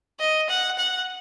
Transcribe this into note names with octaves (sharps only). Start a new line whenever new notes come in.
D#5
F#5
F#5